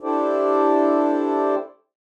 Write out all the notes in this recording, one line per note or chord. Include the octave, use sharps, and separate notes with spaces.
D4 E4 G4 A4 C5 D5